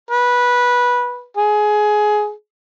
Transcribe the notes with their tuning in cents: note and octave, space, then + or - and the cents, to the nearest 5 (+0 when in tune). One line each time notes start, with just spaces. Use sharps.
B4 -15
G#4 +15